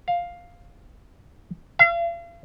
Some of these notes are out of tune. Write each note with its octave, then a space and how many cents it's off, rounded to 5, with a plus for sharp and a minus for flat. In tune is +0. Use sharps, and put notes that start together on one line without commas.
F5 +5
F5 -40